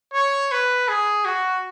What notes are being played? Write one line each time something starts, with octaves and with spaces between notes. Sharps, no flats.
C#5
B4
G#4
F#4